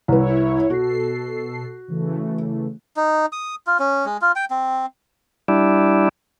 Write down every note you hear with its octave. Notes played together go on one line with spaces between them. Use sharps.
C2 E4 B4 C#5
B2 F#4 A4 C7
C#3 E3 A3
D#4
D#6
F4
C#4
G#3
F4
G5
C4
G3 D4 E4